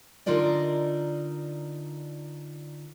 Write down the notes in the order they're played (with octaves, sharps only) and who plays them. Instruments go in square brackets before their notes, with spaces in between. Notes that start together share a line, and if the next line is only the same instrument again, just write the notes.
[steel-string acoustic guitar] D3 D#4 F4 A#4 D5 D#5